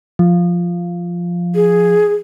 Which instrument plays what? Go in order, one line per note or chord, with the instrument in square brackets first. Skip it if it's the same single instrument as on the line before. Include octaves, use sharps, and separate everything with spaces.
[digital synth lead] F3
[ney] G#4